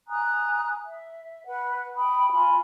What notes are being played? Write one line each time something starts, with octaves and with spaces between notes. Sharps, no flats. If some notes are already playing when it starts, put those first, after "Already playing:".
G#5 A#5 D#6 F#6
E5
B4 F#5
G5 B5 D#6
F4 G#5 B5 C6